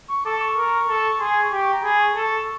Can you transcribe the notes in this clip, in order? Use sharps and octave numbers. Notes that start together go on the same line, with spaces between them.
C#6
A4 D6
C#6
A#4
A4
G#4 C6
C#6
G4 D6
C#6
A#5
G#4 B5
C#6
A4 C#6